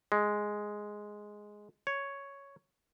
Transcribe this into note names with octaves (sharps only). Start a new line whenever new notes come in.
G#3
C#5